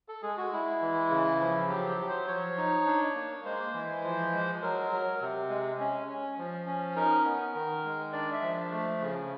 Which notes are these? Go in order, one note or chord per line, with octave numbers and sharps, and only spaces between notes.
A4
G#3 G#4
F#4
G#3 E4
E3
C#3
F3
F#3 G4
G4
F#3
C5
F3 C#5
D#4
D4
A#3
G#3 C5
E3
F3
G#3
F#3 A#4
F#3
C3
G#3
C#4
C#4
F3
C#4
D#4 A#4
B3
D#3
G#3
D4 D5
E5
F3
A3
C#3